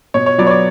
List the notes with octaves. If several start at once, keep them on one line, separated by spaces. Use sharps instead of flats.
B2 C#5
C#5
F#3 B3 D5
C#5
D5